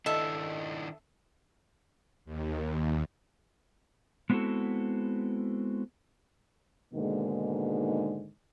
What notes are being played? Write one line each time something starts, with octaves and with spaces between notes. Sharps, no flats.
D#3 D4 E4 A4 D#5 E5
D#2
G#3 B3 C4 E4 F#4 A4
G#2 B2 D3 D#3 G#3 A#3